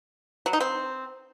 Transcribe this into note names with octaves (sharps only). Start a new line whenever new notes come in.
F#3
D#4
C4